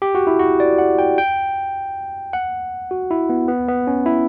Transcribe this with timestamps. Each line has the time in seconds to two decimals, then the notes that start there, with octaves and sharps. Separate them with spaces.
0.02 G4
0.15 F#4
0.27 E4
0.39 F#4
0.60 D5
0.78 F#5
0.99 G5
1.18 G5
2.33 F#5
2.91 F#4
3.11 E4
3.29 B3
3.48 B3
3.68 B3
3.87 C#4
4.06 E4